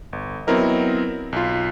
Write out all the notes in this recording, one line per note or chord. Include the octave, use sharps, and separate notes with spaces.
G1
F#3 B3 C4 E4 A#4 D#5
B1 F4